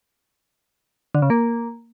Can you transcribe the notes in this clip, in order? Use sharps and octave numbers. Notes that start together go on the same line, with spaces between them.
D3
C#3
A#3